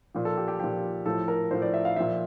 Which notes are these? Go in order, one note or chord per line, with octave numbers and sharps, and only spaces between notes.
A#2 F3
A4
G4
G4
A#2 F3 G4
A2 F3 A4
A#4
A2 F3 C5
D5
E5
F5
A#2 F3 E5